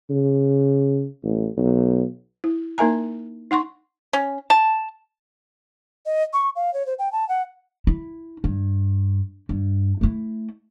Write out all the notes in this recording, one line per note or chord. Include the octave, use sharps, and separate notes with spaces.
C#3
A1
B1
E4
A#3 D#4 A#4 E5 G#5 A#5
D#4 F#5 C6 C#6
C#4
A5
D#5
C#6
F5
C#5
C5
G5
A5
F#5
E4
G2
G2
A3 E4